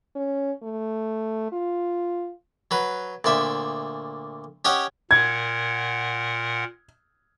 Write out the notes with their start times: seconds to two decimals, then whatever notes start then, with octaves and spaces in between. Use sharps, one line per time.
0.16 C#4
0.63 A3
1.52 F4
2.71 F#3 B4
3.24 D2 A#2 D5 E5
4.65 C#4 G4 C#5 D#5 F#5
5.11 A#2 A#4 F#5 G#6